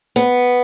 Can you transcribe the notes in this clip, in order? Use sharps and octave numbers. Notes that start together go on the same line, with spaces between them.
B3